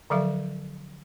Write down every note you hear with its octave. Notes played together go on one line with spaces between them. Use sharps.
D3 F3 F#3 A4 E5 F5